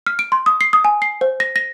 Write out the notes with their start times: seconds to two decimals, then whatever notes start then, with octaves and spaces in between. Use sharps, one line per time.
0.07 F6
0.19 D7
0.32 C6
0.46 D#6
0.61 C7
0.73 D#6
0.85 G#5
1.02 C7
1.21 C5
1.40 A#6
1.56 A#6